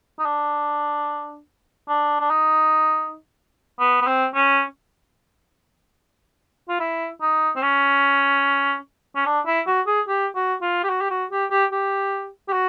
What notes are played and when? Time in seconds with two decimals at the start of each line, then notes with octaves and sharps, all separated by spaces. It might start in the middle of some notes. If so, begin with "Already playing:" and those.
0.19 D#4
0.25 D4
1.88 D4
2.20 D4
2.30 D#4
3.79 B3
4.02 B3
4.07 C4
4.34 C#4
6.69 F4
6.80 E4
7.21 D#4
7.56 C4
7.62 C#4
9.16 C#4
9.26 D4
9.46 E4
9.67 F#4
9.87 G#4
10.08 G4
10.35 F#4
10.62 F4
10.84 G4
10.89 F#4
11.01 G4
11.10 F#4
11.31 G4
11.51 G4
11.72 G4
12.48 G4
12.53 F#4